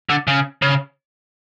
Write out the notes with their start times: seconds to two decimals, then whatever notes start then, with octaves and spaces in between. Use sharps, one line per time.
0.09 D3
0.27 C#3
0.62 C#3